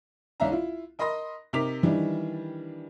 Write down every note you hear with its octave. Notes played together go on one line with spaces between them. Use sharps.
C2 D#3 C#4 E5 F5 A#5
E4 F4
A#4 D#5 B5 C6 D#6 A#6
C3 D#4 A#4 D6 B6 F7
D#3 E3 G3 D4